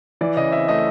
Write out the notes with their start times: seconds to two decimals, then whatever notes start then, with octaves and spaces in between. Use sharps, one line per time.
0.21 E3 D5
0.36 C#3 D#5
0.52 C4 E5
0.68 A3 D#5